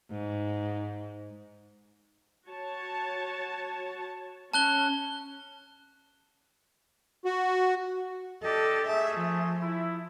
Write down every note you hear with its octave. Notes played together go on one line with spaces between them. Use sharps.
G#2
F#4 C#5 A5
C#4 A5 F#6 G7
F#4
D4 G4 A4 D#5
A3 G#4 E5
F3
E4